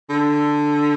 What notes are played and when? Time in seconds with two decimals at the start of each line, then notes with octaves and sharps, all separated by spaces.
0.09 D3